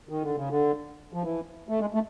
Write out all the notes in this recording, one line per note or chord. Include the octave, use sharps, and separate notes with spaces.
D#3
D3
C#3
D3
F3
E3
A3
G#3
A3